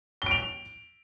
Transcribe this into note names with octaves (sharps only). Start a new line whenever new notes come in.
D7 F7 G7